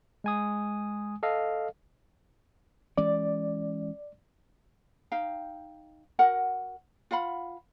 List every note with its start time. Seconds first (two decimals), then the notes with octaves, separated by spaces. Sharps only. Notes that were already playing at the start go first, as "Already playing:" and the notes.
0.24 G#3 G#5 D#6
1.23 A4 D#5 F5
2.98 E3 G#3 C#4 D5
5.12 D#4 F5 G5
6.19 F#4 A#4 F#5
7.11 F4 F5 F#5 B5